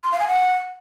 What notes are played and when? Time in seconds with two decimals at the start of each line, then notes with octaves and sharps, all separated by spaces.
0.04 C6
0.12 F5
0.20 G#5
0.28 F#5